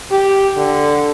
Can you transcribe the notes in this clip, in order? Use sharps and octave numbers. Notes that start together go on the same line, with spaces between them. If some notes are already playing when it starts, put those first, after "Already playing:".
G4
D3